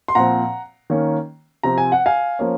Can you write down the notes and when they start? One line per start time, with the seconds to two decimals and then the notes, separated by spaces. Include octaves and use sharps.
0.08 C6
0.15 A#2 F3 C4 F#5 A#5
0.90 D#3 A#3 C#4
1.63 C3 F3 C4 A#5
1.78 G#5
1.92 F#5
2.06 F5 G#5
2.39 F3 A#3 C#4